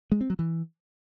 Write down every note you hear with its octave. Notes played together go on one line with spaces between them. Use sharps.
G#3
C4
F#3
E3